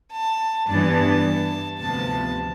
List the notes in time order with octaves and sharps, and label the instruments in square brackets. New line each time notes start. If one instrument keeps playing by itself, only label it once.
[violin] A5
[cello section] G2 E3 B3 D4 [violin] A5
[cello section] D2 C3 F3 B3 [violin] A5